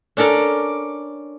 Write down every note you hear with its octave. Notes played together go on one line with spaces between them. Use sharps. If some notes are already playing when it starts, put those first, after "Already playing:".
C#4 D4 A4 A#4 D5